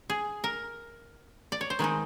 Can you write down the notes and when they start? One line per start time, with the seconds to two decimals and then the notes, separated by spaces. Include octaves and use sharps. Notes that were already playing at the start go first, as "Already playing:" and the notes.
0.10 G#4
0.44 A#4
1.52 D5
1.61 C#5
1.70 C5
1.79 D#3 G#3 C4 D#4 B4